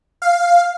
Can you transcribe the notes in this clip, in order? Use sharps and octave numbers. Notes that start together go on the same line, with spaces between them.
F5